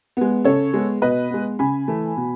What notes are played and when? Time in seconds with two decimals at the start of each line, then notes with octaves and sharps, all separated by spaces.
0.17 G#3 B3
0.44 C#3 A4 C#5
0.74 G#3 B3
1.02 B2 B4 D#5
1.31 G#3 B3
1.59 C#3 G#5 B5
1.88 E3 A3
2.17 B2